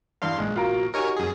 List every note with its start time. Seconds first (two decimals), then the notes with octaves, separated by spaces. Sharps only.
0.22 E2 G2 F5 C6
0.39 A#1 G#3
0.56 F4 F#4 A#4
0.94 D#4 F#4 G4 A#4 C#5 G#5
1.16 F#2 G#4